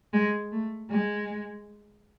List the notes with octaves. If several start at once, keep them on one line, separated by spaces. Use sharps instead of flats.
G#3
A3
G#3